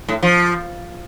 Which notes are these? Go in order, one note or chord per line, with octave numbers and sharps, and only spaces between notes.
A2
F3